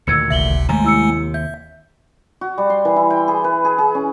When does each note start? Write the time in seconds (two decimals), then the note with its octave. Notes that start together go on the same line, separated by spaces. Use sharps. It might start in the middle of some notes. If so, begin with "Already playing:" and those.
0.07 D2 A#2 D#3 E6 G#6 C#7
0.30 G1 C#2 C3 E5 F#7 G7
0.69 D#2 C3 G#3 A3 G#5 A#5
0.84 E4 E6 C#7
1.34 E5 G6
2.41 F#4
2.58 G3
2.70 C6
2.85 E3
2.96 E4
3.10 G5
3.28 G#4
3.44 B4
3.65 G#4
3.78 G#4
3.95 C#4